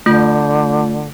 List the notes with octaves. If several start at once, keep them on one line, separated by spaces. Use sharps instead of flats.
D3 A3 F4 G6